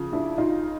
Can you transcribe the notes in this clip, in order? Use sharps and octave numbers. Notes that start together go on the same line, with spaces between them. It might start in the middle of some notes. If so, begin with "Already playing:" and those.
Already playing: C#3 F3
D4 E4
D#4 F4